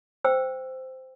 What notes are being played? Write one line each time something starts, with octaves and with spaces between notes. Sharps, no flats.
C5 G5 E6